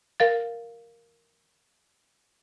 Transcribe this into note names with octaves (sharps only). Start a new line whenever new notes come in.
A#4 F5 A6